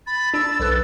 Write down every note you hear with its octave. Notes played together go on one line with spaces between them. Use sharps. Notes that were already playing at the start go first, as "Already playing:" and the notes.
B5 A6
D4 E6
B1 A4 B4